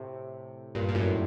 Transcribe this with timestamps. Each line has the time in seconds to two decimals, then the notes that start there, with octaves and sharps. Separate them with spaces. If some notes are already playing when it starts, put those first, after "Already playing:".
Already playing: A2 C3
0.75 G2 A#2
0.88 A#2
0.95 F#2 A2